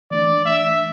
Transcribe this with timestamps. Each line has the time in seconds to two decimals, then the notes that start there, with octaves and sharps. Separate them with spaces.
0.11 E3 A3 D4 D5
0.45 E5